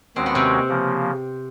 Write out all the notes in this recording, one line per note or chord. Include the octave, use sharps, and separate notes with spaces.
D#2 D#3 G#3 C4 C#4 F#4
B3
C3 C4
C#3 F3 A#3